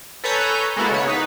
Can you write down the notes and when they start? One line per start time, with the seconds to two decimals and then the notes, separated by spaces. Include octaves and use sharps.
0.24 A4 B4 C#5 G#5 A#5 G6
0.76 G#3 A#3 B3 E4 F#4 A4
0.91 C#3 B3 C#5
1.08 D#4 B4